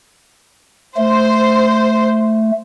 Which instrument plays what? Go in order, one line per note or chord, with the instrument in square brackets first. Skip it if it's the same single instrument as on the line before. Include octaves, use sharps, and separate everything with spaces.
[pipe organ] A3 [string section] C5